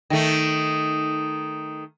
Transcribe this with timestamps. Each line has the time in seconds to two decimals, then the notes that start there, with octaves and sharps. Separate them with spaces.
0.10 D#3 A3